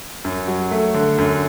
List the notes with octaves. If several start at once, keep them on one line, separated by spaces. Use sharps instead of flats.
F#2
F#3
A3
D3
F#2